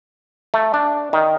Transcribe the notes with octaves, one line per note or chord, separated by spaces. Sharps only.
A3
D4
D#3